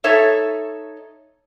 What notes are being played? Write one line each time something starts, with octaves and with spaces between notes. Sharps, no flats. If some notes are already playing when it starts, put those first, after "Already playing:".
D#4 A4 C#5 E5